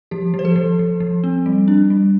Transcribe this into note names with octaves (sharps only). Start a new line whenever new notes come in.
F3 G4
F3
C5
A4
F3
F3
F3
C4
G3
D4
G3